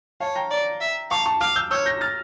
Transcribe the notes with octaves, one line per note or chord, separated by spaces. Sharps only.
C#5 F5 A5
G5 A#5
D5
E5
F5 A5 C#6
A5 C#6
F5 D6 F6
E6 G6
C#5 E6 G6
G6 A#6
F6 A6